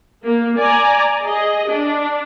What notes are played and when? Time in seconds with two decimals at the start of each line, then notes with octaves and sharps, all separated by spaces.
0.24 A#3
0.58 D5 G#5 A#5
1.23 G#4 D#5
1.66 D4